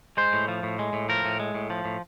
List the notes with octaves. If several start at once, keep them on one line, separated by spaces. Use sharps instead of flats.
G#3 C5
A2
F3
A2
G#3
A2
F3 A#4
A2
G#3
A2
F3
A2